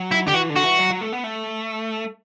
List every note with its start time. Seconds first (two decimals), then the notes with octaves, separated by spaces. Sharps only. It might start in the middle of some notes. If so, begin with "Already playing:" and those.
Already playing: F#3
0.12 E4
0.26 D3 G4
0.34 E3 F#4
0.50 D3
0.56 F#4
0.64 E3
0.79 F#3
0.91 F#3
1.01 A3
1.13 B3
1.24 A3